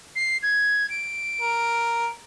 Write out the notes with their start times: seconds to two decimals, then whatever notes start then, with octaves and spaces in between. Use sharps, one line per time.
0.16 C7
0.43 G#6
0.90 D7
1.41 A#4